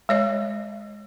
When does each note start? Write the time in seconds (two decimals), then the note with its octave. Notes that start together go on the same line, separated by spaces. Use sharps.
0.09 G#3 C#5 D#5